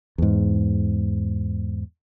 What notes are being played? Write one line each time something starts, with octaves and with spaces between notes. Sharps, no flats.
E2 G#2